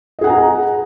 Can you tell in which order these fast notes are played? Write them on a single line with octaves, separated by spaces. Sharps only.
D#5 G#4 F#5 G#5 A#5